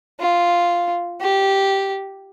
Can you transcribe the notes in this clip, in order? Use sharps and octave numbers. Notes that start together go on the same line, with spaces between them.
F4
G4